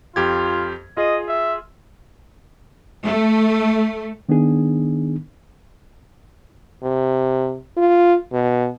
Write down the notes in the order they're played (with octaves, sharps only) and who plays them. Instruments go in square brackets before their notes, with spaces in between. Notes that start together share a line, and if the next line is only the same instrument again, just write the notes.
[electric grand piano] F2 G4 G#6 [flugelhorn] F4
[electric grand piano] F4 G#4 [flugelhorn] D#5
[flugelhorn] E5
[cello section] A3
[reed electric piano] D#3 B3 D4 D#4 G#4
[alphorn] C3
F4
B2